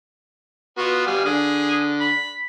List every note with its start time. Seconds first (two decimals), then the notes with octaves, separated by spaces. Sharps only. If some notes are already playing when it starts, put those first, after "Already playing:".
0.78 B3 F4 F#4
1.07 G3 F5 G#5
1.25 D3 G#4
2.00 B5